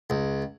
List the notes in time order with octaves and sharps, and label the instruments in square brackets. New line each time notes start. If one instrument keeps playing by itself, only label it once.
[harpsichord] C#2